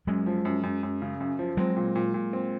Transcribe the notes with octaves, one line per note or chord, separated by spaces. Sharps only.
F#2 F#3 G#3
F3
F#2
F#2
F#2
C#3
F#2
F3
F#3 G#3 C4
A#2
A#2
A#2
C4